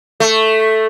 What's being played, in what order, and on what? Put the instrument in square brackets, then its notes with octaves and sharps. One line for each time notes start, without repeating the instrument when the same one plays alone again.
[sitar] A3